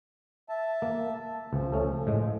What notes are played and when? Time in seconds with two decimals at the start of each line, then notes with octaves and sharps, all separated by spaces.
0.49 E5 A5
0.82 A#3
1.53 C#2 F3
1.72 A3 C#4 A4
2.07 A2 G#3